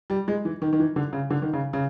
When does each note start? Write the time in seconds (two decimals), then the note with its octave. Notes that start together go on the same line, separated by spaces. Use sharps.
0.10 G3
0.28 G#3
0.45 E3
0.62 D#3
0.73 D#3
0.79 E3
0.96 D3
1.13 C#3
1.30 D3
1.42 D#3
1.53 C#3
1.73 C#3